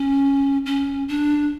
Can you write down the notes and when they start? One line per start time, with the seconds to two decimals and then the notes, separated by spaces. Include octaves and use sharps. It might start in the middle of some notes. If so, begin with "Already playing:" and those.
Already playing: C#4
0.66 C#4
1.08 D4